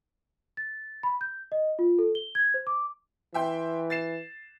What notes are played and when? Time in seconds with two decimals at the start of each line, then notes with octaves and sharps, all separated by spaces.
0.57 A6
1.03 B5
1.21 G6
1.52 D#5
1.79 F4
1.99 A4
2.15 G7
2.35 G#6
2.54 C5
2.67 D6
3.34 E3 E5 G5 C6
3.90 A6 C7 E7